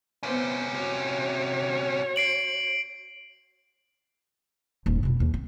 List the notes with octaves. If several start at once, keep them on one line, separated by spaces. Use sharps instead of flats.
C3 B3 C#4 C5
F#4 C#5
C7 D7 F#7
D#1 G#2
F2 B2
D#2 E3
C4